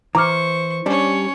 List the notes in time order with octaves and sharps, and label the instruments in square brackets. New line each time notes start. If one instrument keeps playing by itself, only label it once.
[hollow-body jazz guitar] E3 [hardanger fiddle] C5 C#6 [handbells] A#5 D6 F6
[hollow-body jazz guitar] G3 D4 [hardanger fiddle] C#4 C#5